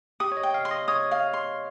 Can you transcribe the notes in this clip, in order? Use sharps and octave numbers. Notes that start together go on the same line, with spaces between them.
G4 D#6
C#5
D#5
G5
F5
C6
D#5
C#5 D#6
F5
C6